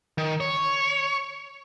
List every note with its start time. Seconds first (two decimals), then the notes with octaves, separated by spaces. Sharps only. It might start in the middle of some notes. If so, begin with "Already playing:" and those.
0.18 D#3
0.40 C#5